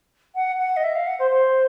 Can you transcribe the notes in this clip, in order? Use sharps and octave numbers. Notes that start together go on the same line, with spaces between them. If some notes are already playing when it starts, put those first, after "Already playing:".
F#5
F#5
D#5
E5
F5
F#5
C5
C5